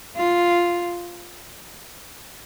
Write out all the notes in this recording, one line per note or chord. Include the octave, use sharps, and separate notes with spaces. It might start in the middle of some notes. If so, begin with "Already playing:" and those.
F4